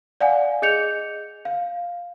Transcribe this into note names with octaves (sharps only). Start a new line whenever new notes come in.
D5 F5 F#5 G#5
G#4 D#5 G6 C#7 F7
F5